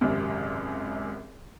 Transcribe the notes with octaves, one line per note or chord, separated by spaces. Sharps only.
G#1 C#2 F#2 C3